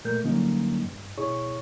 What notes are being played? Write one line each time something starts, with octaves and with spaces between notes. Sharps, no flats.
A#2 A3 A#4 G6
D3 F#3 G3 A#3 C#4 D#4
G2
B2 E4 G#4 C#5 C#6